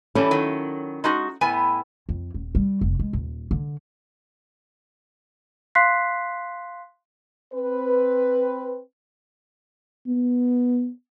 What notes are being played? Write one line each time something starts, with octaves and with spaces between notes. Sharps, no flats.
E3 G3 C#4 E4 A4
D#3 F#3
G#3 D#4 F#4
A2 B3 G#5
F2
D#1
G3
F1
G#3
D#1
D3
F5 C6 F#6 B6 C7
C4 B4
B3